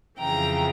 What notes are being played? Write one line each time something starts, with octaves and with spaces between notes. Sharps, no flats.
F2 C#3 E3 G5 A#5